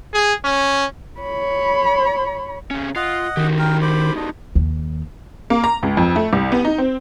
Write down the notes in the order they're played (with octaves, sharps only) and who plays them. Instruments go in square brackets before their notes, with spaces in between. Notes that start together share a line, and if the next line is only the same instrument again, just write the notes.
[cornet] G#4
C#4
[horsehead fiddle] C#5 B5
[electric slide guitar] C3 C#4
[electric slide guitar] F4 [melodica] D#5 F#5
[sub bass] D#3 [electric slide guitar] D#4 F#4 G4
[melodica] A#4 G5
C5 B5 D6
D4 D#5
[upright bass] D#2
[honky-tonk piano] A#3
A#5
C#2
F2
A3
C2
B3
D#4
C4